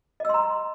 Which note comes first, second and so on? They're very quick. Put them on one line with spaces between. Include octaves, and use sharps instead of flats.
D#5 E6 C6 A#5